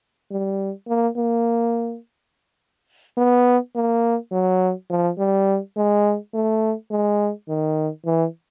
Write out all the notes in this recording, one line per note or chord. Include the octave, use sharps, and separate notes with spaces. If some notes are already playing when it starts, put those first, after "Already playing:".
G3
A#3
A#3
B3
A#3
F#3
F3
G3
G#3
A3
G#3
D#3
E3